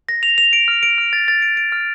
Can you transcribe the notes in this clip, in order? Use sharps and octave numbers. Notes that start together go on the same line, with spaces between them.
A#6
F7
F7
D7
F6
D7
F6
A6
A6
D7
D7
F6